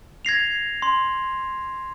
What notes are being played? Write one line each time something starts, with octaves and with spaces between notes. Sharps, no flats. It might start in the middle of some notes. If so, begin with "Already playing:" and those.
G#6 A#6 C7 F7
C6